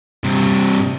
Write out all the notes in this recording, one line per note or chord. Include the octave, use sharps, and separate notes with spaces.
G2 C3